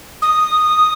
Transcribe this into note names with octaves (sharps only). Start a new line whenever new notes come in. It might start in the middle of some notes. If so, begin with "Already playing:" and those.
D#6